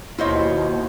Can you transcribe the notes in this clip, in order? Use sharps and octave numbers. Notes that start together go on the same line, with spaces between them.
D#2 B2 E4 F4 C5 C#5 D#5